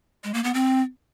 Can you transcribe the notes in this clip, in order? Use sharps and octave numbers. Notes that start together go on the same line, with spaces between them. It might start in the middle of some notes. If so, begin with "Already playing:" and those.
G#3
A#3
B3
C4